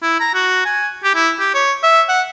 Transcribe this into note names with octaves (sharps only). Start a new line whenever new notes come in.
E4
A#5
F#4
G#5
G4
E4
G4
C#5
E5
F#5